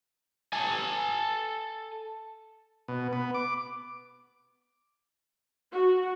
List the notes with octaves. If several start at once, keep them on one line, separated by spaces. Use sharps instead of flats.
A4 G#5
B2
B3
D6
F#4